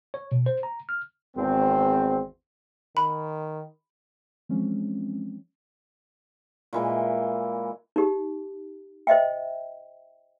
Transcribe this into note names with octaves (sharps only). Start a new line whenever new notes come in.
C#5
B2
C5
A#5
F6
G#1 E2 C4
D#3 B5
E3 F3 G#3 C4 C#4
A#2 E3 G#3
D#4 G4
C5 D#5 E5 G5